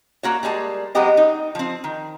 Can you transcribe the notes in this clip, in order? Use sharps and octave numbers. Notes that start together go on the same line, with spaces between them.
A#3 F#4 C#5
G3 G#3 A#3 A5
F#3 G#3 B3 C4 G4 D#5
D#4
F3 C4
D#3